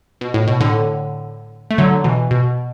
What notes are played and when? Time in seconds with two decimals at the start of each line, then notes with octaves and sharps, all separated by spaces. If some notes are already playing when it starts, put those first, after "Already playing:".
0.21 B2
0.34 A2
0.47 B2
0.60 A2 D3
1.71 A3
1.78 D3 F#3
2.04 B2 E3
2.31 B2